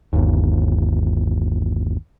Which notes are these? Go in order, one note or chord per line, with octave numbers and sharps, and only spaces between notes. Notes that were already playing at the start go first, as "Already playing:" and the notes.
G1 D#2